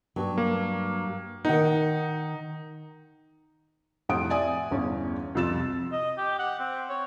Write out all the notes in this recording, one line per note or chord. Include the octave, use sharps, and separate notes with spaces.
G2 F#3
A#3
D#3 D#4 F#5
F2 A2 G4 F#5 D#6 D7
D5 E5 G#5 D#6
G1 E2 C#4
C2 F2 F4 E6 A6 E7
D#5
G4
F#5
C4
C#5